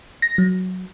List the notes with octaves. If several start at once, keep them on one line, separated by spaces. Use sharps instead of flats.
A#6
F#3